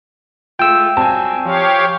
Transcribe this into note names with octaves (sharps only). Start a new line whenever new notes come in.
G#3 A3 F4 G5 E6
F#3 G3 C4 G#5 A5
F3 G4 C#5 F5